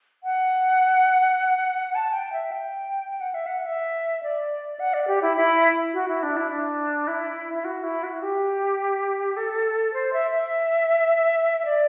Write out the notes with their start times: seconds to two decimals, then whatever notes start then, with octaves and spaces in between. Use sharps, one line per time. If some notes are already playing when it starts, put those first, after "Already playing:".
0.24 F#5
1.95 A5
2.13 G5
2.33 E5
2.52 G5
3.09 G5
3.21 F#5
3.34 E5
3.47 F#5
3.66 E5
4.23 D5
4.80 F#5
4.94 D5
5.08 G4
5.22 E4
5.37 E4
5.94 F#4
6.08 E4
6.23 D4
6.37 E4
6.51 D4
7.08 E4
7.54 E4
7.65 F#4
7.84 E4
8.04 F#4
8.22 G4
9.37 A4
9.94 C5
10.13 E5
10.31 E5
11.65 D5